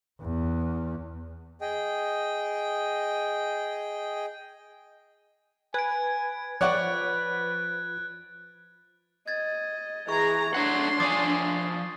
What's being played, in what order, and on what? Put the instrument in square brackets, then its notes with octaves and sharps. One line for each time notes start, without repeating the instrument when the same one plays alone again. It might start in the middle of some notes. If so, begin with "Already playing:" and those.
[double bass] E2
[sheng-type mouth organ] G#4 D#5 G5
[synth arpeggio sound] B4 [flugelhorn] G#5 [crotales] G#6 D7
[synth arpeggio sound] F3 [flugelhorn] B4 [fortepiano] C#5 D5 F#5 [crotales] F#6 A6
[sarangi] D#5 [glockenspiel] G#6 A6
[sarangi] E3 [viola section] G#4 A#5 [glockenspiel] C#6 G#6
[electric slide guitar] A3 C#5 F#5 [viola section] D4 [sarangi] C6
[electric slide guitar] F3 D5 G#5 [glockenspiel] D6 D#6 A6